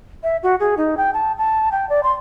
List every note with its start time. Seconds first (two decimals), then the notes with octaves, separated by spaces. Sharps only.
0.23 E5
0.43 F#4
0.60 G#4
0.77 D#4
0.97 G5
1.14 A5
1.38 A5
1.72 G5
1.89 D5
2.03 C6